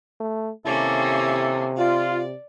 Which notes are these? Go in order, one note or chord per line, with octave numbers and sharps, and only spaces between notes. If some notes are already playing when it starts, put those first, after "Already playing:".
A3
C3 D#3 A#3 C#4 E4 G4 A4
F4 D5